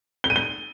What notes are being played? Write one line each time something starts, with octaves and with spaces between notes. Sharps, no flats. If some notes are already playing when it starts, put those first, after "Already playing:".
G7
D#7
G7